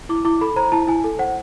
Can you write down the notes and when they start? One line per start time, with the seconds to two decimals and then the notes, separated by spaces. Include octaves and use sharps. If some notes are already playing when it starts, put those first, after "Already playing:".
0.09 E4 D6
0.25 E4 D6
0.41 A4 B5
0.56 C5 A#5
0.72 E4 A5
0.87 E4 G#5
1.04 A4
1.19 C5 F#5